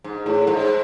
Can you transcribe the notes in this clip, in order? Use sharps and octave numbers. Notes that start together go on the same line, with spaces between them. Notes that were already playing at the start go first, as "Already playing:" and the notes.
G#2
A2
G#2